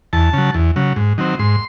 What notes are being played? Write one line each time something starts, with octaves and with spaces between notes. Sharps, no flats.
E2 A5
C#3 F#3
E2
C#3 F#3
G#2
D#3 F#3 C4
G#2 C6